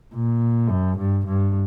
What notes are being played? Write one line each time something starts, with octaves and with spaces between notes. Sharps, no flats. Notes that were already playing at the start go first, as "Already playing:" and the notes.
A#2
F#2
G2
G2